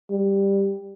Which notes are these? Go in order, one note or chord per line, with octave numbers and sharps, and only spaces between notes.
G3